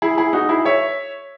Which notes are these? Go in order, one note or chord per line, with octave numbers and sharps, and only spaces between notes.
E4 G#4
E4 G#4
D#4 F#4
E4 G#4
C#5 E5